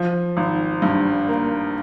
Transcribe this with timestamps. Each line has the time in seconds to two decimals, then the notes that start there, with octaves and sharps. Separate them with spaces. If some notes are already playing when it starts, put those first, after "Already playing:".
Already playing: F3
0.37 G#1
0.82 G2
1.28 A#3